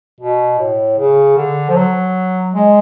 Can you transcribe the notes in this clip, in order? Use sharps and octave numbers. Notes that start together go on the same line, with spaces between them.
B2
A2
C#3
D3
F3
F#3
G#3